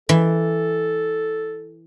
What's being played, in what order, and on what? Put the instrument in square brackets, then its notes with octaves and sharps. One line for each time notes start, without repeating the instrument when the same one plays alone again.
[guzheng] E3 [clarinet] A4